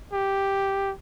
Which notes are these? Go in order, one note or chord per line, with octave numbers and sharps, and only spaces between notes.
G4